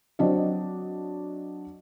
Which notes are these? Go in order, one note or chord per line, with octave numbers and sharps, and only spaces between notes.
F#3 C4 D4 D5 D#5